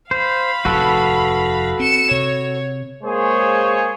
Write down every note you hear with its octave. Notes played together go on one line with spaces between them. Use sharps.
C5 F5 B5
F1 D#2 A2 F#4 A4 B4
C4 C#7 E7
C3 C#5
G#3 A#3 G#4 C5 C#5